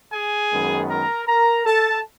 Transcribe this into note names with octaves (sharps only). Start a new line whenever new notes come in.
G#4 G#5
F#2 D#3 G#3 B3
A#4 A#5
A#4 A#5
A4 A5